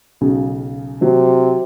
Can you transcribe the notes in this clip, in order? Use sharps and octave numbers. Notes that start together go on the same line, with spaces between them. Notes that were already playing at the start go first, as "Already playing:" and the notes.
B1 C#3 G#4
C3 F#3